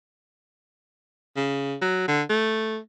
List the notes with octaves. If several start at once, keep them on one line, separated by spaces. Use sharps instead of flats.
C#3
F#3
D3
A3